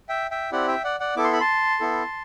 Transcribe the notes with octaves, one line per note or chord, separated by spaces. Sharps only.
E5 G5
E5 G5
C4 E4 G4 D5 F#5
E5 G5
D5 F#5
D5 F#5
B3 E4 A4 D6
C6
B5
A5 C6
B3 E4 A4